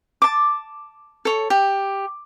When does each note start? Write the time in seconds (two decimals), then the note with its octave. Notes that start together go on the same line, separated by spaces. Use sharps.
0.22 A5 D6
1.25 A4 C#5
1.50 G4